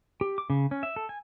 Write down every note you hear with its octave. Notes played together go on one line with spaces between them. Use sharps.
G4
D6
C#3
C#4
E5
A4
G#5